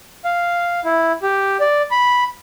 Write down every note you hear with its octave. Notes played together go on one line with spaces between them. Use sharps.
F5
E4
G4
D5
B5